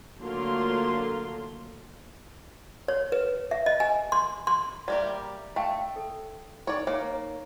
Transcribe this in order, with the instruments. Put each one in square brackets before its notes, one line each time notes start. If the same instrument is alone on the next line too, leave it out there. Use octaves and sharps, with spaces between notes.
[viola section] D3 F#3 A3 A#3 F4 C6
[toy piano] C#5
B4
E5
D#5
G#5
C6
C6
[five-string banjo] G3 A#3 G4 [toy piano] D5 E5 A#5
[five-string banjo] A3 [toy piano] F5 G5 A5
[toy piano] A4
[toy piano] D#4 D6 [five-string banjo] C#5 D5
[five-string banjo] A#3 [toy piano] C#5